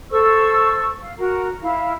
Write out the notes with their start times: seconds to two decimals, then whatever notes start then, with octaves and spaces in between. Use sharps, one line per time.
0.10 A4 C5 C#6 E6
1.01 F5
1.17 F#4 A#4
1.61 E4 F5